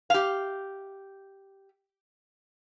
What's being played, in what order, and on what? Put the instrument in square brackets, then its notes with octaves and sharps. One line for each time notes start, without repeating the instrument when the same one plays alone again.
[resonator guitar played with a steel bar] G4 F5